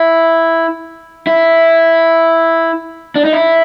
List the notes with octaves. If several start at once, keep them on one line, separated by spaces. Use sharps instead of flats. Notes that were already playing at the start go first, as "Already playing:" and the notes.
Already playing: E4
E4
D4
D#4
E4